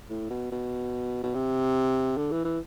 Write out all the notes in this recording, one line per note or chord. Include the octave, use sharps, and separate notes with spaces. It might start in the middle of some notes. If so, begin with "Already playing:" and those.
A2
B2
B2
B2
C3
D3
E3
E3